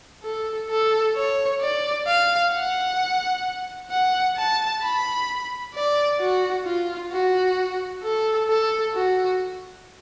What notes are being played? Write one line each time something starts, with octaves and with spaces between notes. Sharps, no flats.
A4
A4
C#5
D5
F5
F#5
F#5
A5
B5
D5
F#4
F4
F#4
A4
A4
F#4